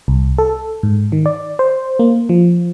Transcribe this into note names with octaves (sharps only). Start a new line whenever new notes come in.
C2
A4
G#2
D#3
D5
C5
A#3
F3